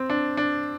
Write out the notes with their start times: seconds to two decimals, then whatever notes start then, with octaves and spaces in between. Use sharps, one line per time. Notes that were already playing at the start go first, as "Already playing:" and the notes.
Already playing: C4
0.10 D4
0.37 D4